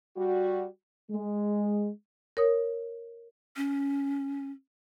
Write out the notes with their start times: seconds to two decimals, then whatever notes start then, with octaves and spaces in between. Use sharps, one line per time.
0.17 G3 F#4
1.12 G#3
2.37 A#4 C#5 D#6
3.56 C#4